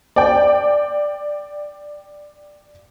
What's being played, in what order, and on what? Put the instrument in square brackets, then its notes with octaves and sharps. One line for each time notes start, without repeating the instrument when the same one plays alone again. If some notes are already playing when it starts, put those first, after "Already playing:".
[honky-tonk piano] D5 G5